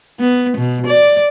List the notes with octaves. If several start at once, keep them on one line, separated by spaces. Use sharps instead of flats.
B3
B2
D5